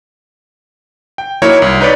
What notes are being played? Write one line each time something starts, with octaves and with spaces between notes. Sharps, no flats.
G5
F#3 A#3 D#4 E4 A#4 C#5
C2
D#4 B4 C#5 D5